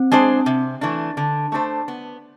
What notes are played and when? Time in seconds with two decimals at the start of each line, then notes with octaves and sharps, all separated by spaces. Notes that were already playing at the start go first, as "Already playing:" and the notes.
Already playing: C4
0.12 G#3 D4 G#4 C5
0.46 C3
0.81 E3 A3 D4
1.17 D3
1.52 A3 D4 A4 C5
1.88 B3